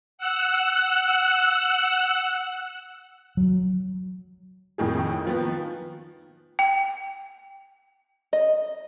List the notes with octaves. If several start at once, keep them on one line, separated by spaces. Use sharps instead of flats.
F#5 E6 F#6
F#3
F2 A2 D#3 G#4
D#3 F3 B3
G5
D#5